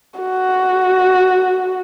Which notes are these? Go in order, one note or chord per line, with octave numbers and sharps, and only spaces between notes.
F#4